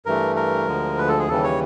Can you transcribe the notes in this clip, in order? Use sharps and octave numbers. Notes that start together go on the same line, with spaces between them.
G2 E3 A3 A#4
A#4
D2 D3 F3 G#3
B4
A4
G#4
D#2 C#3 E3 G3 A4
C#5